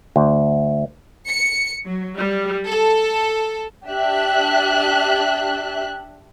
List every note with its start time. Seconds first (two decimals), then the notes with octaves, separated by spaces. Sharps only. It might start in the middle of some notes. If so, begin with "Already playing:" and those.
0.16 D2
1.29 C#7
1.85 F#3
2.19 G3
2.68 A4
3.88 D4 G4 E5 F#6